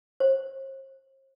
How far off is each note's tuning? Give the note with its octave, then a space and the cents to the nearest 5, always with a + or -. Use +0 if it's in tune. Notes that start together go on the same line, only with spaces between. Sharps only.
C5 +40